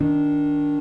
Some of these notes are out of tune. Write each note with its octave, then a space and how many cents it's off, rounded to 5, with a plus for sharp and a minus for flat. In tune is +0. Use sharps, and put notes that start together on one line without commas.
D#3 +0 D4 -10